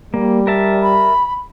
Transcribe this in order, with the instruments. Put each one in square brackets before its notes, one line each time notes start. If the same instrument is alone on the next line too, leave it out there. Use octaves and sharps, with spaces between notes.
[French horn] G3 [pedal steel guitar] A#3
[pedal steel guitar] A#4 E5 A5
[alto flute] B5